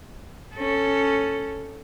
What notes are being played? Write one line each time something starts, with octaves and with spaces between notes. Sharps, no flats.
C#4 A4